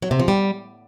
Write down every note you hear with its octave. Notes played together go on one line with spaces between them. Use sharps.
F#3
C3
F3
G3